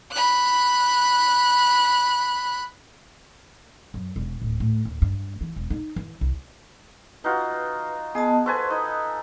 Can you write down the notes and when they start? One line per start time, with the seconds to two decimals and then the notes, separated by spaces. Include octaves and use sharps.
0.12 B5 F#6
3.94 F#2
4.16 E1
4.42 D1
4.60 A2
4.85 D#2
5.02 G2
5.41 E3
5.56 E1
5.70 D#4
5.96 E3
6.21 C2
7.24 D#4 F4 F#4 B4
8.15 B3 G#4 D#5 A5
8.46 A4 B4 C5 G#5 C6 C#6
8.71 D#4 D#6